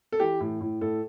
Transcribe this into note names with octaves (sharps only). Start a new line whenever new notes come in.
A4
E3 G4
A2
A2
A2 A4